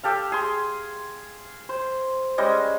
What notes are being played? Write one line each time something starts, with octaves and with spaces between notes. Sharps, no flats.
G4 A4 F5
G#4 C6
C5
G3 G#3 C#4 D#5